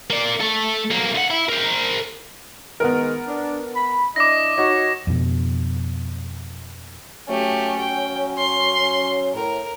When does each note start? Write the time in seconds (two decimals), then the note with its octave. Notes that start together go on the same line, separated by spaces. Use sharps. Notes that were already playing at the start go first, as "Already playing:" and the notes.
0.10 A#3 D5
0.41 A3 A4
0.91 B1 A#3
1.14 D2 F#5
1.31 E4
1.49 A#4 C5
2.80 D#3 G#3 B3 A#4
3.27 D4
3.75 B5
4.16 D4 E4 D#5 D6 A#6
4.58 D#4 F#4 C#5
5.07 F2 B2
7.29 F#3 A3 C#4 G4
7.79 G5
8.38 C6
9.35 A2 A#4